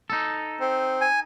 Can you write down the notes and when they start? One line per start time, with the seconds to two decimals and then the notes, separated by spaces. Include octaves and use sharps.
0.10 D#4 A4
0.61 C4
1.01 G#5